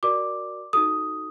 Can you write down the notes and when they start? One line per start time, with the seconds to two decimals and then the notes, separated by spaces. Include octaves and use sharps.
0.03 F#4 A#4 D5 D6
0.73 D#4 F#4 A4 D#6